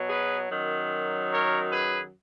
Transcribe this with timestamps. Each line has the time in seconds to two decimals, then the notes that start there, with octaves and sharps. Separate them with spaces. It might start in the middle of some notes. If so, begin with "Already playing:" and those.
Already playing: B2 F#3
0.09 G#4 B4
0.50 F#2 D#3 F#3
1.32 A#4 C#5
1.72 G#4 B4